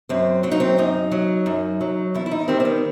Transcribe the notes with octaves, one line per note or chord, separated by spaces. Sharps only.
F#2 C4
F#3 C4
D#4
C4
F#2 D#4
F#3
F#2
F#3
E2 E4
E4
D#4
D#3 G3 C4
C4
B3